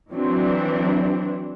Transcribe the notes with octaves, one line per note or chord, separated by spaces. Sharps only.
E3 F#3 C4 D4